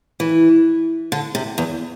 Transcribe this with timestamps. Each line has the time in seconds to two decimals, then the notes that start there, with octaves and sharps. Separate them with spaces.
0.20 E3
1.12 D3
1.35 C3
1.58 E2